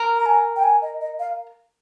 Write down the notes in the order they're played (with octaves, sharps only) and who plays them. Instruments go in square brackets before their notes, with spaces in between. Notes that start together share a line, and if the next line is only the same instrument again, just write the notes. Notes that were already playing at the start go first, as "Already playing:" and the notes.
Already playing: [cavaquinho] A#4
[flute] A#5
G#5
G5
G#5
D#5
D#5
F5